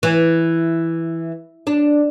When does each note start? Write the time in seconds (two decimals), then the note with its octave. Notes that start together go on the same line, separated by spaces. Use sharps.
0.03 E3
1.67 D4